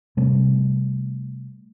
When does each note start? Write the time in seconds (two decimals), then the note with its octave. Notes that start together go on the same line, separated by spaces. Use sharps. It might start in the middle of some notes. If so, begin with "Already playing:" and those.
0.17 C3 G3 A3